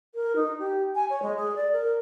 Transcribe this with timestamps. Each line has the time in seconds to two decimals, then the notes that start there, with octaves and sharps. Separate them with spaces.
0.15 A#4
0.35 D#4
0.58 G4
0.95 G#5
1.09 C#5
1.22 G#3
1.36 G#4
1.55 D5
1.72 A#4